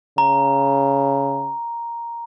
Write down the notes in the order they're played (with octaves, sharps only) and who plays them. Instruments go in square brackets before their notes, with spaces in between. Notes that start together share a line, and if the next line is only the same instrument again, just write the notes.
[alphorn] C#3 [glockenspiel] A#5